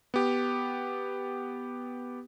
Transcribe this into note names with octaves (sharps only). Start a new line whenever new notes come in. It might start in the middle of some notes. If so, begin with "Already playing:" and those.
B3 G4